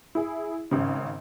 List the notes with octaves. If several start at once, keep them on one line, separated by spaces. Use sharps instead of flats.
E4 G#4
G#1 C#3